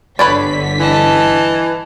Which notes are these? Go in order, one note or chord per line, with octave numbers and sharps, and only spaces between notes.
G1 D3 B4 C#5 D5 B6
E3 D#5 A5